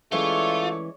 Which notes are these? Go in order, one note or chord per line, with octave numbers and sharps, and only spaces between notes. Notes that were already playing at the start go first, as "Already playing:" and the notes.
E3 G#3 A3 C#4 F4 C#5 D5